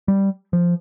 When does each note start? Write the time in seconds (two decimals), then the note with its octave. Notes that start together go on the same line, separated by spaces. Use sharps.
0.08 G3
0.53 F3